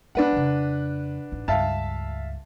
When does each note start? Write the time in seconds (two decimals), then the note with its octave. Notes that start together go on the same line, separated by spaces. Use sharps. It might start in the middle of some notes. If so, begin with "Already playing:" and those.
0.15 G#3 D4 B4 F#5
0.32 F2 C#3
1.32 A1 D#4
1.48 C#2 G2 E5 F5 A5